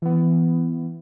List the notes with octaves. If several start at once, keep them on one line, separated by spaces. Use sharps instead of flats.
E3 B3